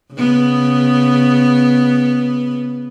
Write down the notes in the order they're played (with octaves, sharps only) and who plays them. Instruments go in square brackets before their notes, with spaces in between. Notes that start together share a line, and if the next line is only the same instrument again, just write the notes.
[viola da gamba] C#3 B3